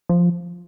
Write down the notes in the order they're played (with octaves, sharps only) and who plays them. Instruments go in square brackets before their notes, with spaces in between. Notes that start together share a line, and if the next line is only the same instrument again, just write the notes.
[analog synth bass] F3